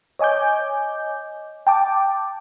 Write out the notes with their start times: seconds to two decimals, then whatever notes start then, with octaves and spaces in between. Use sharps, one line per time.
0.19 C#5 D#5 G#5 D6 G6
1.67 G5 A5 D6